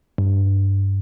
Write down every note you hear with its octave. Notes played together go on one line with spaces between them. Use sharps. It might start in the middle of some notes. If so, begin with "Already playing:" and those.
G2